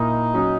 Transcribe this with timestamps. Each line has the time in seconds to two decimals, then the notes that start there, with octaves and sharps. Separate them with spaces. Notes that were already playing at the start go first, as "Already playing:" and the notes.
Already playing: A#2 A#3 D#4 E4
0.34 F#3 C#4 F#4